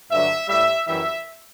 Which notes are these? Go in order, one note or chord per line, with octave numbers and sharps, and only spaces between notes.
G2 D3 F#3 E5
A2 G3 E5
F#2 E3 G3 E5